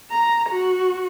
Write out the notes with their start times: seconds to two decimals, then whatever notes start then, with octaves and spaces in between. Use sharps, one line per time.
0.11 A#5
0.49 F#4